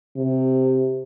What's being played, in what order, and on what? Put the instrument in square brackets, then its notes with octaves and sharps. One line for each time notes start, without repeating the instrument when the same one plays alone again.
[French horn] C3